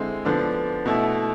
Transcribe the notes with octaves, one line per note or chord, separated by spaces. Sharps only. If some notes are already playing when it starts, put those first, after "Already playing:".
Already playing: D3 G#3 C4 E4
D3 F3 B3 D4
B2 A3 E4